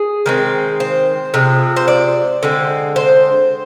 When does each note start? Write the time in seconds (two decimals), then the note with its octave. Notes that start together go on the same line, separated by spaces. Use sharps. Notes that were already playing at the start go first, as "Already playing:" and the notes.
Already playing: G#4
0.26 D#3 G#3 C4
0.80 C5
1.34 C3 F3 G#3
1.76 C5
1.88 D5
2.43 D3 G#3 C4
2.96 C5